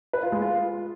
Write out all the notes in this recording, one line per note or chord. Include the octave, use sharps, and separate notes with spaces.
B4
F4
G#3
F4